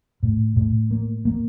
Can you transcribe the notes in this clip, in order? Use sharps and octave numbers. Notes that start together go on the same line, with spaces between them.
A2
A2
A#3
A#3